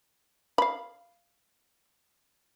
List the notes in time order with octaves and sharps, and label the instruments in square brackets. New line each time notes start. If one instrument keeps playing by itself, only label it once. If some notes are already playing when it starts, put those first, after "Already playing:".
[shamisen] F5 B5